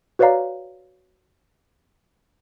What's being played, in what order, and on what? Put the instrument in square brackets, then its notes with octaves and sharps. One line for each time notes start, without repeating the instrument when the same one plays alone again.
[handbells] F#4 B4 C#5 D5 F5 A#5